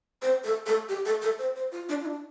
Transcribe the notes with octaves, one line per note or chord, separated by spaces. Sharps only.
C5
A4
A4
G4
A4
A4
C5
C5
F4
D4
F4
D4